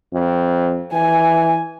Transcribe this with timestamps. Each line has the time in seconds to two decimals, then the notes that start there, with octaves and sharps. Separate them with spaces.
0.13 F2
0.93 E3 G#5